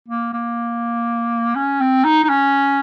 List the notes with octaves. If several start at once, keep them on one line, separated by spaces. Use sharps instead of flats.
A#3
A#3
C#4
C4
D#4
D#4
C#4